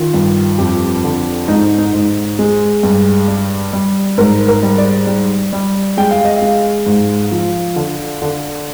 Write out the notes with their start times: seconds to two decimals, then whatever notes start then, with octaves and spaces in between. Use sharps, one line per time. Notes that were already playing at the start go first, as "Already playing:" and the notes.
Already playing: D#3 F4
0.14 G2
0.58 F2 G4
1.04 D3
1.48 G#2 D#4
1.78 D#4
1.93 G#2
2.39 G#3
2.83 G2
3.28 G3
3.73 G3
4.18 G#2 A#4
4.48 A#4
4.63 G3
4.78 D5
5.07 G3
5.53 G3
5.97 G#3 G5
6.11 F5
6.25 D#5
6.37 G#3 F5
6.86 G#2
7.32 F3
7.76 D3
8.22 D3